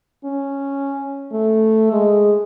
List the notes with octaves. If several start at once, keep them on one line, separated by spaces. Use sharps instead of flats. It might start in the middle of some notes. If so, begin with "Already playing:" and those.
C#4
A3
G#3